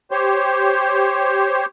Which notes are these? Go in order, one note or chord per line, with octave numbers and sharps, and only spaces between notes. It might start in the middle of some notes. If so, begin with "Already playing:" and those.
G4 C5 C#5